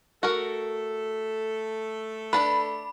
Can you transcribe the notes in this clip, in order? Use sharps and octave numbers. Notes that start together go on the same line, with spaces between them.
A3 F#4 A4 A#4
D4 B4 B5